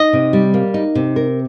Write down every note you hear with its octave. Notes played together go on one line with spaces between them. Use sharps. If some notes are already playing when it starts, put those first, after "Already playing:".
Already playing: D#4 D#5
C3
G3
A#3
D#4
C3
A#4